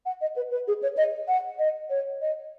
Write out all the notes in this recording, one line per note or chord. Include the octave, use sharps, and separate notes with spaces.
F#5
D#5
B4
B4
G#4
C#5
D#5
F#5
D#5
C#5
D#5